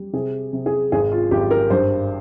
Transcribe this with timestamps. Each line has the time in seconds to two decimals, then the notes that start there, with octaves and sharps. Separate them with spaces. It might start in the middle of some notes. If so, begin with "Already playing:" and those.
Already playing: G3
0.13 C3 G#4
0.53 C3
0.66 G#4
0.92 G#1 G#4
1.12 F4
1.31 G#1 G4
1.51 A#4
1.70 G2 C5